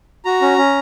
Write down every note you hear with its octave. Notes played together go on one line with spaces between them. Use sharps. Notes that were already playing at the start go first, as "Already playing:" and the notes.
F#4 A#5
C#4
C#4